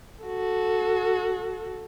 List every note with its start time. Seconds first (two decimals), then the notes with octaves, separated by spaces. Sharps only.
0.24 F#4 A4